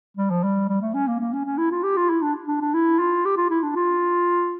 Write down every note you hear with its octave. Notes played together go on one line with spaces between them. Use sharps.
G3
F3
G3
G3
A3
C#4
A#3
A#3
C#4
C#4
E4
F4
G4
F4
E4
D4
D4
D4
E4
F4
G4
F4
E4
D4
F4